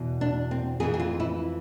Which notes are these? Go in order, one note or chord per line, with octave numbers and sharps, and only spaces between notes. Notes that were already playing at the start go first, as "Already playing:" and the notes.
Already playing: E2 B2
D4
C4
F2 E3 G#4
G#4
F4
E4